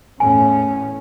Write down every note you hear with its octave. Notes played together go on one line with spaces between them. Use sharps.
E2 A2 C#4 G#5